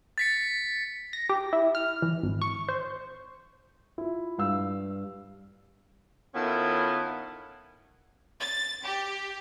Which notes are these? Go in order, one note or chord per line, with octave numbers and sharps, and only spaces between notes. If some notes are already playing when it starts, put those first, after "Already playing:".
A6 B6 C#7
A#6
G4
E4
F6
E3
G#1
C#6
C5
E4 F4
G2 F5 E6
D#3 B3 C#4 E4 F4 A4
A6
G4